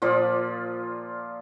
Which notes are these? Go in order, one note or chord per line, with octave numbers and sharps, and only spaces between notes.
A#2 F3 F4 D5